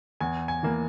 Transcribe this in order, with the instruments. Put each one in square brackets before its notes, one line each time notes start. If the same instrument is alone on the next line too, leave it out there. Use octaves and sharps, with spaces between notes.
[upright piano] E2 G#5
G#5
E3 A#3